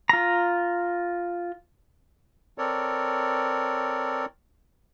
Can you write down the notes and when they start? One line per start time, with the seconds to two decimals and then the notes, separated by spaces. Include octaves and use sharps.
0.09 F4 A#5
2.58 C4 A4 A#4 C#5 D5